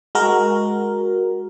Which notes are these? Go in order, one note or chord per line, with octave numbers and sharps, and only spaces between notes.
G#3 F#4 A#4